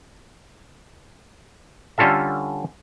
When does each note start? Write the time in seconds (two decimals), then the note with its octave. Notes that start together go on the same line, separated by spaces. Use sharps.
1.98 D3 G3 C#4 F4 A4 E5